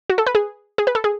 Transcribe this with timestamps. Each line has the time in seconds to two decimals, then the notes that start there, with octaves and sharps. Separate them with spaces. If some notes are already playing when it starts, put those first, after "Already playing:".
0.10 F#4
0.18 A4
0.26 B4
0.35 G#4
0.78 G#4
0.87 B4
0.95 A4
1.04 G#4